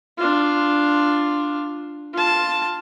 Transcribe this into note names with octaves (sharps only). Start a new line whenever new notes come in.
D4 F4
F4 A5